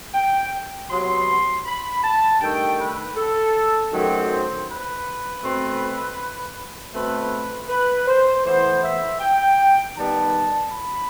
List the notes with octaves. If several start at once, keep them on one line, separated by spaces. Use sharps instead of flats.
G5
C3 F#3 B3 C6
B5
A5
G2 D#3 A3 G5
B4
A4
F#2 D#3 F#3 A3 C4 G4
C5
B4
B2 A3 C4
B2 A3 C4 B4
B4
C5
A2 E3 B3 C5
E5
G5
D#3 G3 B3 A5
B5